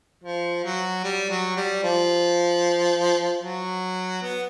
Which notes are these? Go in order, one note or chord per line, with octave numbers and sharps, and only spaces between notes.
F3
F#3
G3
F#3
G3
F3
F#3
B3